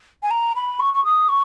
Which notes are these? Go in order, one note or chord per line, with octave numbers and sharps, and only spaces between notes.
G#5
A#5
B5
C#6
C#6
D#6
C#6